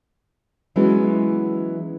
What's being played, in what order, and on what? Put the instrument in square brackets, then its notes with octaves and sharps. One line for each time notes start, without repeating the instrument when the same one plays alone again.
[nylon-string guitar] E3 F#3 G#3 B3 C#4 E4